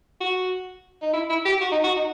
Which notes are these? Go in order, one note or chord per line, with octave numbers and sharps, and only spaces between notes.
F#4
D#4
E4
E4
G4
F#4
D#4
F#4
D#4